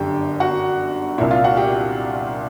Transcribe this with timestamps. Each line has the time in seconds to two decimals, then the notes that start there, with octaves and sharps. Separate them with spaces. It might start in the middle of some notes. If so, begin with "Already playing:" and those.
Already playing: G1 F#2 D3 G4 G5
0.40 F#4 F#5
1.18 C2 A#2 E4 E5
1.31 F4 F5
1.44 F#4 F#5
1.57 G4 G5